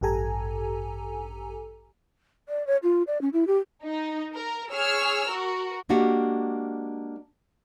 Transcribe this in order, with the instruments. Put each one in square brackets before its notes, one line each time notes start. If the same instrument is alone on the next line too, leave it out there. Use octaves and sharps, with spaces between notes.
[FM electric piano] A1 G2 G4 A4 G#5 A#5
[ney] D5
C#5
F4
D5
C#4
E4
G4
[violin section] D#4
A#4
G#4 C#5 E6 F6
F#4 A#4
[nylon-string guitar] G#3 A#3 D4 F#4 G4 F5